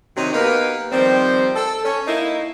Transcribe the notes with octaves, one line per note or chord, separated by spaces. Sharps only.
C3 D#3 F#3 D#4
A#3 B3 D#4 G4 A#4 B4
D#3 F3 G3 C4
A4
C#4
A#3 D#4 E4